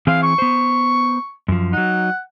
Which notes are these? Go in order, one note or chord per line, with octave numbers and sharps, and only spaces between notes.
E3 C4 G#4 F5
C#6
B3 C5
F#2 F3
F#3 D#4 F#5